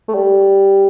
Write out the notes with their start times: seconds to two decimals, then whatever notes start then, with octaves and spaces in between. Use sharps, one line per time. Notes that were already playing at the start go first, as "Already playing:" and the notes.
0.08 A3
0.14 G3